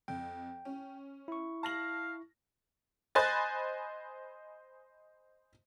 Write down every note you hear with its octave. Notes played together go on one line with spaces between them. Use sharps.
F2 G5
C#4
E4 C#6
F5 A5 A#6 F#7
C5 D#5 G#5 B5 F#6 A6